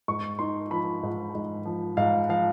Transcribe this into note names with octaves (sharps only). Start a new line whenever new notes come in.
G#2 C#6
D#4 C6
F3 B5
G#2
G#2
F3
G#2 F5
F3 F5